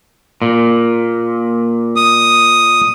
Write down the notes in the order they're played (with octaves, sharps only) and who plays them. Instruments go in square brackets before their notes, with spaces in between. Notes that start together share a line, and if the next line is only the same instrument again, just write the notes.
[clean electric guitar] A#2
[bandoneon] D#6